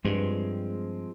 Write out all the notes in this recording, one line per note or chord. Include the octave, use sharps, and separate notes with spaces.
G2 F3 G#3 C4